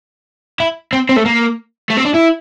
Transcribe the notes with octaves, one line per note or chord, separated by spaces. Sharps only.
E4
C4
C4
A3
A#3
A3
C4
D4
E4